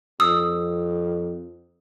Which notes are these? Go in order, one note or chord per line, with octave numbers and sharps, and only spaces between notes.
F2 D#6 E6